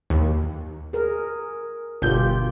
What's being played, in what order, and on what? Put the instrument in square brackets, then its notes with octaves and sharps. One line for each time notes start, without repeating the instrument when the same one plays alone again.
[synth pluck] D#2
[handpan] G#4 A#4
[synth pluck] G1 G6 [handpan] B2 F4 G4